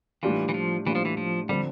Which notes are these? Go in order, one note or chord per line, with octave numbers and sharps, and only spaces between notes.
A2 E3 G3 D4 F4
E3
F3
A2 E3 G3 D4 F4
F3
E3
F3
D3 F3 G3 C4